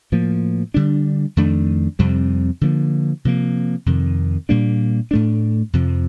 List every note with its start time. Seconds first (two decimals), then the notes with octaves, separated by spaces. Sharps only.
0.12 A2 F3 A#3
0.74 D3 G3 D4
1.37 F2 D#3 A3 D4
1.99 F2 C3 G3 C4
2.61 D3 F3 A#3
3.25 C3 F3 A#3
3.86 F2 C3 D#3
4.49 A#2 G3 A#3 D4
5.11 A2 A3 D4
5.73 F2 C3 F3